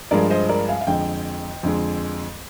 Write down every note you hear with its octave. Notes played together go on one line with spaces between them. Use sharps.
G2 F3 G#3 A#4 D5
C5 D#5
A#4 D5
F5 G#5
F5
F2 D3 G#3 D#5 G5
F2 D3 G#3